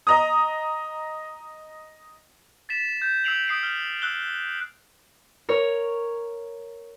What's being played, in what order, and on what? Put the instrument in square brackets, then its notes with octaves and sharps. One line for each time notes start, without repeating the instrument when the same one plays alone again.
[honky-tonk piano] D#5 A#5 D#6
[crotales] A6 B6 E7
G6
E6 G6 C7 D7 F7 F#7
D#6 C7 D7
F6 G7
E6 F#6 G7
[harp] A#4 C#5